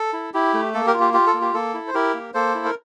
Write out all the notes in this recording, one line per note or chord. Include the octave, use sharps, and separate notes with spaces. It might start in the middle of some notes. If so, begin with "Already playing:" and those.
Already playing: A4
E4
E4 G4
A3
A#3 A4
G4 A#4
F4
G4
F4 G4
A4
A#3
G4
A#3 A4
E4
C5
E4 G4 A#4
A#3
A#3 A4 C5
E4
A#4